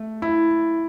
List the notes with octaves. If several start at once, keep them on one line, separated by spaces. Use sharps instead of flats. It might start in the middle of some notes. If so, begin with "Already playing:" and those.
Already playing: A3
E4